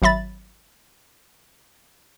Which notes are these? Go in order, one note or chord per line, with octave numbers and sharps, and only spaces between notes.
G#1 F#3 E5 B5 A6